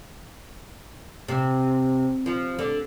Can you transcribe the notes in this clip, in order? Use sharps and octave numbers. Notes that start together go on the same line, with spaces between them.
C3
F3
D3